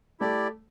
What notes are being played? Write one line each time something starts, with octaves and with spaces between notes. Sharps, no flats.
A3 E4 G4 D5